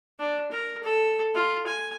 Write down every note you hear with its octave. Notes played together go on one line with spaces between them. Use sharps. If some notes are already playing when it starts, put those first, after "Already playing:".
D4
A#4
A4
F4
G#5